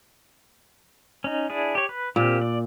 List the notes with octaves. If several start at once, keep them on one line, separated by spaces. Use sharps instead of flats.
C#4 D#4
D4 E4 G#4
G4 C#5
B4
A#2 A#3 C4 G4
D5